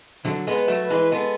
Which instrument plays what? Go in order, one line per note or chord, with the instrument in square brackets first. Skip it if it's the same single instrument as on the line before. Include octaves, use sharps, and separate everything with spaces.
[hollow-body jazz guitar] D3 F#3 [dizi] A4
[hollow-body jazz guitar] G#3 B3
[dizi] B4
[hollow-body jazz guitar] F#3 A3
[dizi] B4
[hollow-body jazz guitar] E3 G#3
[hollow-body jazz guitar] G#3 B3 [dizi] A4